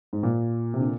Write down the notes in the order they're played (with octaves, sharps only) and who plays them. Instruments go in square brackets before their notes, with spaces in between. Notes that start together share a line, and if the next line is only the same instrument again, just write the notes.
[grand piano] G#2
A#2
C3
D3